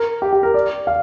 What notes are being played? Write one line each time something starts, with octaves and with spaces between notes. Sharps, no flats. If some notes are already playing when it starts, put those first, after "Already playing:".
Already playing: A#4
G4
G4
A#4
D5
F5